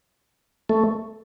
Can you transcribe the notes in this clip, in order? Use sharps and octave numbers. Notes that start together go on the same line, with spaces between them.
A3